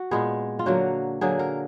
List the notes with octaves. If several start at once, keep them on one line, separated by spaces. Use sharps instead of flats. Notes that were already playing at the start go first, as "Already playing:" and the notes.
Already playing: F#4
A#2 G#3 B3 G#4
F4
D3 F#3 A#3 F#4
D3 F#3 A#3 G#4
A#4